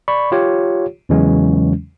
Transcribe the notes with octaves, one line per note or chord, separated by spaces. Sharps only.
D5 B5 C#6
F4 G4 C#5
E2 C#3 E3 F#3 G#3 C#4